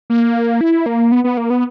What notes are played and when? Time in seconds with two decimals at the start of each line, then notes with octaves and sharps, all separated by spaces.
0.10 A#3
0.61 E4
0.86 A#3
1.12 B3
1.24 B3
1.37 A#3
1.50 B3